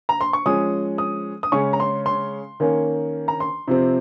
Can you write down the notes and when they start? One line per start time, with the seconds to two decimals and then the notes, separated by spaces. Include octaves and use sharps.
0.09 A#5
0.21 C6
0.33 C#6
0.46 F3 G#3 C#4 D#6
0.98 D#6
1.43 D#6
1.52 C#3 G#3 C#4 C#6
1.73 A#5
1.80 C6
2.06 C6
2.60 D#3 A#3 C#4
3.28 A#5
3.40 C6
3.68 C3 F3 C4